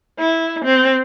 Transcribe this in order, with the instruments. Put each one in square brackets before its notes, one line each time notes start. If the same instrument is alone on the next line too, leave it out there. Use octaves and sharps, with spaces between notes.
[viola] E4
C4